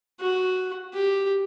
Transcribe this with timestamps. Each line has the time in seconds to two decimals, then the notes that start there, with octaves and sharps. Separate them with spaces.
0.20 F#4
0.93 G4